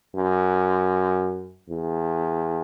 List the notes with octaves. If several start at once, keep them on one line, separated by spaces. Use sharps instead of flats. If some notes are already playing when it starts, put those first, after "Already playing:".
F#2
E2